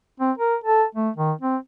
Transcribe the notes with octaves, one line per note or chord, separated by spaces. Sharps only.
C4
A#4
A4
A3
D#3
C4